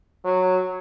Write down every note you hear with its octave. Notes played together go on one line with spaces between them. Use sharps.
F#3